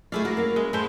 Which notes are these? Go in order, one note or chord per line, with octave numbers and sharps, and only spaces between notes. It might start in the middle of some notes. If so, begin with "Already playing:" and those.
A3 E4 G#4 D5 F5
F#4 A#4
A#3 C#4
G#3
A2 G#3 E4 A4 C5